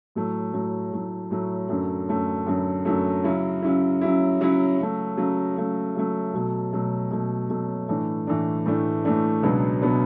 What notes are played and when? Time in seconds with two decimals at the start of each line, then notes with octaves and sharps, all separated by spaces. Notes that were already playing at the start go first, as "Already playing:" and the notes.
0.15 A2 F#3 A3
0.53 A2 F#3 A3
0.92 A2 F#3 A3
1.31 A2 F#3 A3
1.69 F#2 D3 F#3 A3
2.09 F#2 D3 F#3 A3
2.46 F#2 D3 F#3 A3
2.85 F#2 D3 F#3 A3
3.24 C#3 F#3 C#4 E4
3.62 C#3 F#3 C#4 E4
4.01 C#3 F#3 C#4 E4
4.40 C#3 F#3 C#4 E4
4.79 C#3 F#3 A3
5.17 C#3 F#3 A3
5.57 C#3 F#3 A3
5.95 C#3 F#3 A3
6.34 B2 F#3 A3
6.73 B2 F#3 A3
7.11 B2 F#3 A3
7.50 B2 F#3 A3
7.89 A2 E3 A3 D4
8.27 A2 E3 A3 D4
8.66 A2 E3 A3 D4
9.05 A2 E3 A3 D4
9.43 C#2 B2 F#3 B3 D4
9.81 B2 F#3 B3 D4